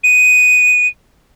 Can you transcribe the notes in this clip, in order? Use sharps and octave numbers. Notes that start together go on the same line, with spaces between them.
D#7